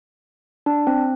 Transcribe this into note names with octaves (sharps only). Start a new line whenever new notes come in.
D4
C4